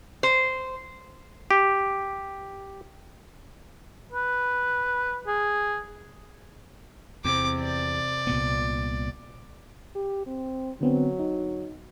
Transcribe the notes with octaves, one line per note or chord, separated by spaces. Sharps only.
C5
G4
B4
G#4
E2 C3 C4 D6
D5
C2 A#2 B3
G4
C4
D3 F#3 B3 C4
D#4